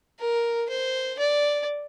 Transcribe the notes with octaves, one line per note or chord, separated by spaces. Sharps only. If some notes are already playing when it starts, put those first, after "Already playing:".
A#4
C5
D5